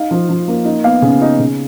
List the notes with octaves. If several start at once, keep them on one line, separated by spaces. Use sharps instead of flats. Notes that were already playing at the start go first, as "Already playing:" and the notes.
Already playing: D#4 F5
F3
F3
A#3
D#4
B3 F5
C#3
D#4
C#3